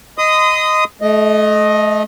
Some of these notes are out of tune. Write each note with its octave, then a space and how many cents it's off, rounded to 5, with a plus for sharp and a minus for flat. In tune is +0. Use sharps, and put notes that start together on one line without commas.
D#5 +0 C6 -40 D#6 +0
A3 -35 D#5 +0